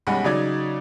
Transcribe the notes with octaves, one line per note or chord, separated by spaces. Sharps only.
B1 G3 G#3 C#4 F#5 B5
C#3 F#3 D#4 D5 G#6